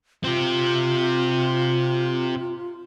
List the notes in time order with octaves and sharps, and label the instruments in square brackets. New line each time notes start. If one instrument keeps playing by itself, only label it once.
[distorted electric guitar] C3 C4 [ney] F4